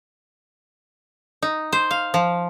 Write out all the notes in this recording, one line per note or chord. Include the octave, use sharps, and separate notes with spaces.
D#4
C5
F5
F3